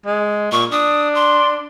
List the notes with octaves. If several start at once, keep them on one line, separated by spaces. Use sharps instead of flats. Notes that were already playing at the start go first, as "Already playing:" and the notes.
G#3
A#2 C#6
D4 D#6
C6